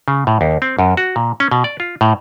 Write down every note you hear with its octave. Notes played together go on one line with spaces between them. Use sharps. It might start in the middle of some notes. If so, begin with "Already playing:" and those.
C#3
A2
D#2
C4
F#2
F#4
A#2
C#4
B2
D5
F4
A2